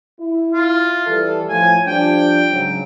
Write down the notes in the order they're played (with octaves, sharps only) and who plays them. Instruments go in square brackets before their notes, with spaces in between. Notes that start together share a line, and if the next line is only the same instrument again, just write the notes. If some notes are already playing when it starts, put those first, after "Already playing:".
[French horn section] E4
[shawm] F4
[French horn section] E3 G3 A4
[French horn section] A2 F3 [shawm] G#5
[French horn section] F3 G3 D4 [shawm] G5
[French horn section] G#2 C#3 F#3